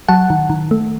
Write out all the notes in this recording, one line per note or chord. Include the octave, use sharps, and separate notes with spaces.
F#3 F#5 A5
D#3
D#3
A3